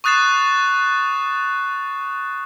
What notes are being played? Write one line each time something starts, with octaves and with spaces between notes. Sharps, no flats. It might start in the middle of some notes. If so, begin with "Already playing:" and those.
C#6 D#6 F#6 A6 C7 E7